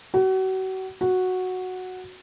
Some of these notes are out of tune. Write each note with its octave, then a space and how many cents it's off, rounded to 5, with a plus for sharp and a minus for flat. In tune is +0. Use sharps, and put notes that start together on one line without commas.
F#4 +35
F#4 -5